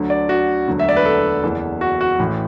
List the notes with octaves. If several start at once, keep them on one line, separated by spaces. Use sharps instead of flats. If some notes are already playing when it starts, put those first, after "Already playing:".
Already playing: D2 D3 F#3
D5
F#4
E1 D2 D3 F#3
E5
D5
B4
A4
F#1 E2 E3
F#4
F#4
A1 A2 E3